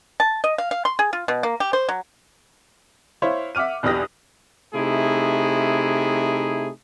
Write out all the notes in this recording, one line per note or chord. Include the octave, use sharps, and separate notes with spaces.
A5
D#5
F5
F5
C6
G#4
F4
B2
A#3
G4
C5
F#3
E4 C5 C#5 F5
E5 F#5 D6 F6 D#7
B1 E2 D4 G4 D#6 A#6
C3 A3 D#4 E4 G#4